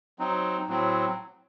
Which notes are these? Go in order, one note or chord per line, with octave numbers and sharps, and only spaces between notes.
F#3 C4 D#4
A2 F#3 C4